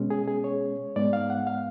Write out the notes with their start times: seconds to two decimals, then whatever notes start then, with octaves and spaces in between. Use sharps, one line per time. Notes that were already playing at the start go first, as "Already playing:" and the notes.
Already playing: B2 G#3 C#4
0.10 G#4
0.27 G#4
0.44 C#5
0.96 G#2 G#3 B3 D5
1.13 F5
1.30 F#5
1.47 F5